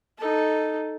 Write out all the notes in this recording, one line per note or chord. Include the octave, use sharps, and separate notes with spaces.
D#4 A4